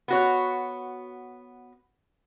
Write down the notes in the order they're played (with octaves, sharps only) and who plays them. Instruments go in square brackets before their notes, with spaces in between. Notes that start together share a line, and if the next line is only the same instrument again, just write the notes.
[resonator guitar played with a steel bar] B3 F#4 C#5